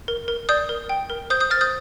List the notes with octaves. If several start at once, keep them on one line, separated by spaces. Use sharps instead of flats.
A#4
A#4
D5 D#6 G6
A#4
G5
A#4
C5 D#6 G6
D#6 G6
C5 F6 A6
D#6 G6